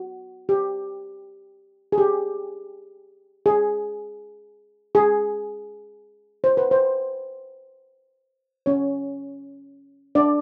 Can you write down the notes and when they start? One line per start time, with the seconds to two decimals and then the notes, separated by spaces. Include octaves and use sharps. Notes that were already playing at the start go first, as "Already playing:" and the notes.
Already playing: F#4
0.49 G4
1.92 G#4
1.98 G4
3.46 G#4
4.95 G#4
6.44 C5
6.57 B4
6.71 C5
8.66 C#4 C#5
10.15 D4 D5